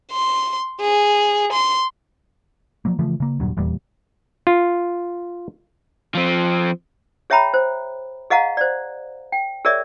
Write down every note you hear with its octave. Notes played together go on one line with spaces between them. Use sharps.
C6
G#4
C6
F3 F#3 A#3
C#3 E3 F3 A3
C#3 A#3
D#1 G2 A#2 F#3
D#1 E2 A#2 G3
F4
F3 C4
G#4 C#5 E5 G5 A#5 B5
C5
G#4 D#5 F5 F#5 A#5
C5 D5
G5
G#4 A#4 C#5 D5 E5